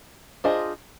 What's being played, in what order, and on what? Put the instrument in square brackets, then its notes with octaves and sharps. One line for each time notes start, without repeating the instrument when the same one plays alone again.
[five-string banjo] D4 F4 G#4 C5 D#5